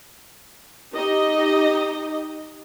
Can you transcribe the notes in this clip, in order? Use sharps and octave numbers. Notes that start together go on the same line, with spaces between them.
D#4 G4 D#5